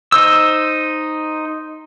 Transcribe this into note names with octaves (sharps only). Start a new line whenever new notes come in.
D#4 C5 E6